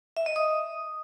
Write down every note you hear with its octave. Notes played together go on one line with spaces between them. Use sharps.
E5
D#5
D#6